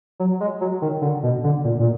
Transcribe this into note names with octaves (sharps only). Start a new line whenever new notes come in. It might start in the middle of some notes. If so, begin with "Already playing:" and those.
F#3
G#3
F#3
D#3
D3
B2
D3
A#2
A#2